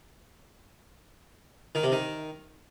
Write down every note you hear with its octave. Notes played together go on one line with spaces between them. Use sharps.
D#3
C3
D#3